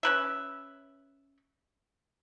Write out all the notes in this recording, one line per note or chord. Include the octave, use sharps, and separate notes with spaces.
C#4 B4 E5